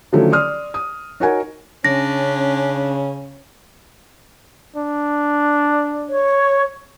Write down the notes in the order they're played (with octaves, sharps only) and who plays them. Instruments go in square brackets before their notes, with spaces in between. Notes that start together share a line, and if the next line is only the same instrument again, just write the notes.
[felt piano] D3 D#3 F3 F#3 A3 C#4
D5 C6 D#6 F6
D#6
D#4 F#4 A#4 C#5 F#5 G#5
[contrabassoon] C#3 [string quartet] C#4 [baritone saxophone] D4 [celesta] A#6
[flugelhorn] D4
[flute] C#5